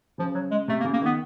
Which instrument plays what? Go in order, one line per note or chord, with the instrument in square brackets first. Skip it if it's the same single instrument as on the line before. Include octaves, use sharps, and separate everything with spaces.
[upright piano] C#3 [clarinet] F3
[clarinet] F#3
G#3
[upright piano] C3 [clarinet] A3
[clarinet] A#3
[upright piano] C#3
[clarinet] A#3
[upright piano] D#3 [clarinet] B3